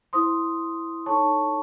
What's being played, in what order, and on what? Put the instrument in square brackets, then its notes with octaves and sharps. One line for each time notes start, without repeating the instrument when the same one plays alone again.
[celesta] E4 C5 C6 D#6
D#4 A4 C#5 A5 C#6